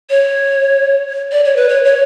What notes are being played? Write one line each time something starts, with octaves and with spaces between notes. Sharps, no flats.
C#5
D5
C#5
B4
C#5
C#5